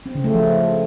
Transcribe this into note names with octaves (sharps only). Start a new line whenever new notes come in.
C4
C#3
A3
F3